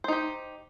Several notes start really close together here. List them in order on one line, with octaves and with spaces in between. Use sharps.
C5 D#4 G4